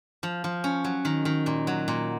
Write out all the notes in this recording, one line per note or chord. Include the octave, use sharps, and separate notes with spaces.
F3
F3
C#4
F#3
D#3
D#3
A#2
F#3
A#2